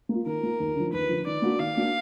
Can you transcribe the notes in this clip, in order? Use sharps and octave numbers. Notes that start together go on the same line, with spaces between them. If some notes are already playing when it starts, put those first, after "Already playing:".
A#3 F4
D#3 A#4
A#3 F4
D#2
D3 F3
D#2 B4
D3 F3
D#3 D5
A#3 D4 F#4
D#3 F5
A#3 D4 F#4